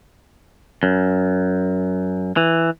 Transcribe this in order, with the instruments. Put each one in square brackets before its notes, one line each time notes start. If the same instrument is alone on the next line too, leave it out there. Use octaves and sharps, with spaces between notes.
[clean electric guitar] F#2
E3